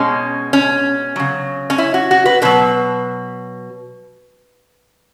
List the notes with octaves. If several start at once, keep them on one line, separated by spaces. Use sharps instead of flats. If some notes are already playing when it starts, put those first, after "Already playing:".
Already playing: B2 G#3 C#4
C#4
C#3 F#3
C#4
E4
F#4
F#4
B4
B2 F#3 B4